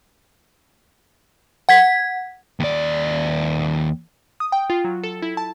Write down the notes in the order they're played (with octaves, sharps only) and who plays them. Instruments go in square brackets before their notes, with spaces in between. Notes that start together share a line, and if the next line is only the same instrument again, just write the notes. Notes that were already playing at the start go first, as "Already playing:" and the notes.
[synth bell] F#5 G#6 B6
[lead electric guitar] D#2 D5
[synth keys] D#6
G5
F4
F#3
A4
E4
A5